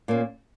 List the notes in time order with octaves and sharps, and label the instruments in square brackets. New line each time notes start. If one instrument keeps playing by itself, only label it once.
[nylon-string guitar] A#2 A#3 C#4